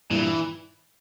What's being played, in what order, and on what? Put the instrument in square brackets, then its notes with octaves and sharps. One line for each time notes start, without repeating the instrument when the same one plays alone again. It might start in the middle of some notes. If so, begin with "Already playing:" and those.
[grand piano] G2 A#2 [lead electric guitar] E3